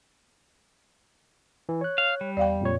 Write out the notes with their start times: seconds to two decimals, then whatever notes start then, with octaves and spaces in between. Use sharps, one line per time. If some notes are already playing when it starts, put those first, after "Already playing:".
1.69 E3
1.81 C#5 F#6
1.98 F5
2.21 G3
2.37 E2 D5 F5 G5
2.61 F2 A#2 C#5